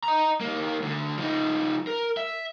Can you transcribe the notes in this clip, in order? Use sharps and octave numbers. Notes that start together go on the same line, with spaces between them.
D#5 A#5
D#2 A#3
D2 D3
F3 D#4
A#4
E5